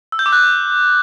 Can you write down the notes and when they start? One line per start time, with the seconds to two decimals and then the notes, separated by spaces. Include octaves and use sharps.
0.12 E6
0.19 G6
0.26 D6
0.32 F#6